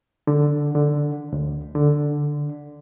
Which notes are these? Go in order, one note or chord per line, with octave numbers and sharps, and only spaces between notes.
D3
D3
D2
D3